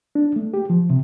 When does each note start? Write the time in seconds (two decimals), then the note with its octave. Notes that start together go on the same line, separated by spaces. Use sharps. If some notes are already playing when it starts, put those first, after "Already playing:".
0.15 D4
0.36 A3
0.54 G4
0.70 F3
0.90 C3